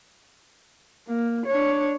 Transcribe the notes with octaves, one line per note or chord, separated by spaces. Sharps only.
A#3
D4 C#5